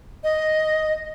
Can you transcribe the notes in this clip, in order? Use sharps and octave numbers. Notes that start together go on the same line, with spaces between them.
D#5